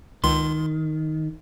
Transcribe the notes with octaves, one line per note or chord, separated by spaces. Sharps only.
C#2 D#3 C6